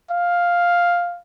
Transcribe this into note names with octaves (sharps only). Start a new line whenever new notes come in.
F5